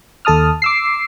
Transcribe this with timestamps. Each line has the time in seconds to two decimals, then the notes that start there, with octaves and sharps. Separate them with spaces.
0.25 D#2 A4 A5 D#6 F6
0.62 D6 E6 C7